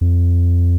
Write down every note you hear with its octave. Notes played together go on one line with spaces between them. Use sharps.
F2